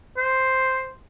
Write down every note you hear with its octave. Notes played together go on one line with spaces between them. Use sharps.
C5